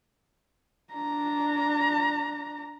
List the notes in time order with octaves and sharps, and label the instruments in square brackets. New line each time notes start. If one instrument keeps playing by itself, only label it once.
[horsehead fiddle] D4 A#5